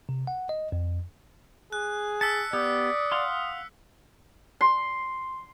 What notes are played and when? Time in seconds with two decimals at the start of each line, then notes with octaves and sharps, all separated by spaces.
0.09 C3
0.27 F#5
0.49 D#5
0.72 F2
1.72 G#4 F#6
2.21 A5 E6 B6 C#7
2.53 B3 G4 D5 D#6
3.12 F5 F#5 C6
4.61 C6